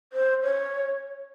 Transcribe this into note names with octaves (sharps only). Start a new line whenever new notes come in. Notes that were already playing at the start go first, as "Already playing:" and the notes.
C5
C#5